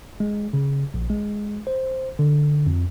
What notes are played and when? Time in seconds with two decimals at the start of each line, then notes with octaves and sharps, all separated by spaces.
0.20 G#3
0.53 C#3
0.94 A#1
1.10 G#3
1.67 C5
2.19 D3
2.67 F2